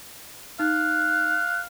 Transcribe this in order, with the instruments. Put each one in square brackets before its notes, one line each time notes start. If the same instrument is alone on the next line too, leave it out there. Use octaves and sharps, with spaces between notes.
[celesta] D#4 [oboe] F5 [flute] F#6